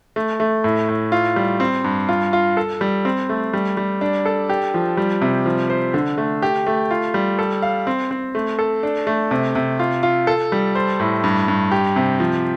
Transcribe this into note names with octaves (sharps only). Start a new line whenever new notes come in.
A3
A3
A2
A2
F4
G3
C4
G2
F4
F4
A4
G3
C4
A3
G3
G3
D4
A4
G4
F3
G3
C3
F3
C5
D3
A3
G4
A3
F4
G3
A4
F5
C4
C4
A3
A4
D4
A3
C3
C3
F4
F4
A4
G3
C5
A2
G2
G2
G4
C3
F3